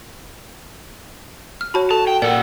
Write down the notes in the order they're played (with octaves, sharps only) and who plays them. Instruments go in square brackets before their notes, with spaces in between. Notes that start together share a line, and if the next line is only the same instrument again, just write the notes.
[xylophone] F6
[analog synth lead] F#4 [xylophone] C#5 A5 B5
[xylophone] A4 [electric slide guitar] A5
[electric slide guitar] G5
[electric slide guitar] A#2 F#5 [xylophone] A#4 D5 G5 [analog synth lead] E6